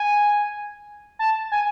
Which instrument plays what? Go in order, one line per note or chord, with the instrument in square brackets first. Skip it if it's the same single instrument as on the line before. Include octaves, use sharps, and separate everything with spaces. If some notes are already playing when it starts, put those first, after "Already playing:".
Already playing: [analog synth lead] G#5
A5
G#5